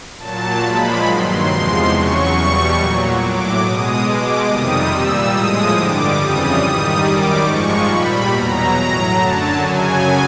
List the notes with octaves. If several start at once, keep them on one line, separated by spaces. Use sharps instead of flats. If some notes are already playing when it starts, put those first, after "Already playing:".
A#2 F#3 A5
A#2 F3 G#3 B5
G2 D#3 F#3 C6
E2 C3 F3 G#3 C6
E2 C#3 F#3 C#6
E2 B2 G3
A#2 F#3
A2 F#3 D6
B2 G#3 D#6
B2 G#3 D6
F2 C3 D#3 G3 D#6
A#2 G3 E6
A2 F3 G#3 D#6
G2 D3 G3 D6
F2 C#3 E3 G3 D#6
G#2 D#3 G3 D#6
F#2 D#3 G3 D6
G#2 F3 G#3 C#6
A#2 G3 B5
E2 B2 F#3 A#5
A2 F#3
F#2 D3 F#3 A5
F#2 C#3 F#3 G#5